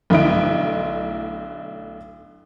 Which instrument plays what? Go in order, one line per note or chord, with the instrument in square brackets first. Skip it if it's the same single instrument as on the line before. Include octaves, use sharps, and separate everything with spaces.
[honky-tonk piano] B1 D3 A3 E4 D#5 D7